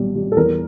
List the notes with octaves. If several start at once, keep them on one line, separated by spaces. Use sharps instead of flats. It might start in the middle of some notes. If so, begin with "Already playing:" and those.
Already playing: B1 A#2 G3
G3
A4
E2 A#4